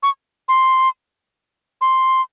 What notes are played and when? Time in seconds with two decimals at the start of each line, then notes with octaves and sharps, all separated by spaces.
0.03 C#6
0.48 C6
1.81 C6